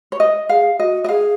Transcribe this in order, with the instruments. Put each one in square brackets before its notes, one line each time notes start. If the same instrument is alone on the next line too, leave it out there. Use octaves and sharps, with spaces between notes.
[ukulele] C#5
D#5
[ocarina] G#4 [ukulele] F5
[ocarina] F#4 [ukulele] D#5
[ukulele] D#5
[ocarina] G#4 [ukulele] F5